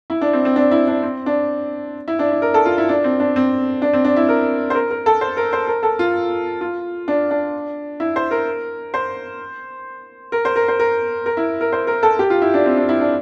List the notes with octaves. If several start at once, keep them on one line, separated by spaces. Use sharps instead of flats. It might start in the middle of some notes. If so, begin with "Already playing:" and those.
E4
D4
C4
C4
D4
E4
D4
C4
D4
E4
D4
E4
A#4
A4
F4
E4
D4
C4
D4
C4
D4
C4
D4
E4
A#4
C5
A#4
A#4
A4
C5
A#4
C5
A#4
A4
F4
F4
D4
D4
E4
C5
A#4
C5
A#4
C5
A#4
C5
A#4
A#4
E4
A#4
C5
A#4
A4
G4
F4
E4
D4
C4
D4
E4
D4